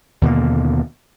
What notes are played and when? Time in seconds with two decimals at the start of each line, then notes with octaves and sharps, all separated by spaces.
0.22 D#2 B2 D3 A#3